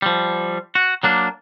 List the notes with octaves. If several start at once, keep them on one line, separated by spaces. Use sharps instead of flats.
F3 G3
F#4
F#3 A#3 D4